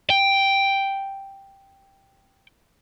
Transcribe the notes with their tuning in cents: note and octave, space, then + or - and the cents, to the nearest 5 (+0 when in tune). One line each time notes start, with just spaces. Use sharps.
G5 +0